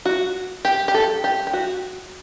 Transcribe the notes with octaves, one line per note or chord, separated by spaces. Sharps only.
F#4
G4
G4
A4
G4
G4
F#4